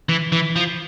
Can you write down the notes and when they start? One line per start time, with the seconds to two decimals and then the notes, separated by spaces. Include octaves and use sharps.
0.09 E3
0.32 E3
0.56 F3